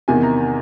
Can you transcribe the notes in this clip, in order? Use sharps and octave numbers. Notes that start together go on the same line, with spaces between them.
E2 C3 D#3 G#5
A#5